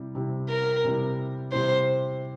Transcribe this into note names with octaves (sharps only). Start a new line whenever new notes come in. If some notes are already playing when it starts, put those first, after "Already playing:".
Already playing: C3 G3 C4 E4
C3 G3 C4 E4
A#4
C3 G3 C4 E4
C3 G3 C4 E4 C5